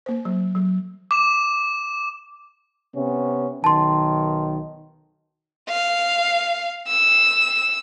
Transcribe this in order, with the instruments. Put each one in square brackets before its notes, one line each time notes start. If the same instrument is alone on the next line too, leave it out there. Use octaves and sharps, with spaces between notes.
[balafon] A#3 C5
F#3
F#3
[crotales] D6 E7
[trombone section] C3 B3 C#4
[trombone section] B1 D#3 [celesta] A5 C6
[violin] F5
E6